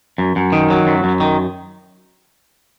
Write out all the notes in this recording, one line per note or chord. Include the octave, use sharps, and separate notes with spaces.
F#2
F#2
D#3
F#3
F#2
F#2
D#3